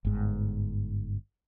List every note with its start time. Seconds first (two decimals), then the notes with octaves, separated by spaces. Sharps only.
0.05 G1 G#2